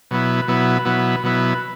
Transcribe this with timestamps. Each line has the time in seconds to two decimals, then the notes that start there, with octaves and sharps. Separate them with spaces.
0.11 B2 F#3 B3 E4
0.48 B2 F#3 B3 E4
0.85 B2 F#3 B3 E4
1.23 B2 F#3 B3 E4